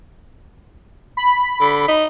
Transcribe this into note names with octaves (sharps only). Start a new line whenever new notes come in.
B5
D3
D#4